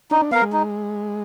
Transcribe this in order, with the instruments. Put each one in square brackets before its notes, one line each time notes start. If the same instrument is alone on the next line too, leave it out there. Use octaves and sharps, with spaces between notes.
[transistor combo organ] D4 [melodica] D#4
[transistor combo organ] D4
[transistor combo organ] B3 [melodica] A#4 F5
[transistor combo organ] G#3
[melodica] D#4